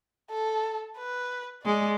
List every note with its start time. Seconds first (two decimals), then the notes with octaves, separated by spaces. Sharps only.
0.30 A4
0.97 B4
1.65 G#3 D5